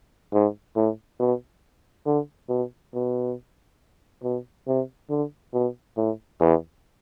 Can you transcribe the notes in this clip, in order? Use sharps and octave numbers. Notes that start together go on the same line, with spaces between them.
G#2
A2
B2
D3
B2
B2
B2
C3
D3
B2
A2
E2